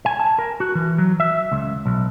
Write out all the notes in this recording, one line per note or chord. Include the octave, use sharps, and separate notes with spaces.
G#5
A5
A#4
F#4
E3
F#3
E5
C#2
B1